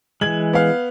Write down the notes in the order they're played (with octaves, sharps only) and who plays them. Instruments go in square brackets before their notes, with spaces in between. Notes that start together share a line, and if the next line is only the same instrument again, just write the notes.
[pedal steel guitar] E3 G#3 [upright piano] G#6 F#7
[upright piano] B3 F5